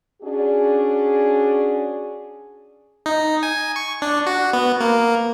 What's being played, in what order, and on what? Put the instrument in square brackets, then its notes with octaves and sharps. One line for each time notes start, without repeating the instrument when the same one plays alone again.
[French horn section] C#4 D4 F#4 G#4
[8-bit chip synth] D#4
G#5
C#6
D4
F#4
B3
A#3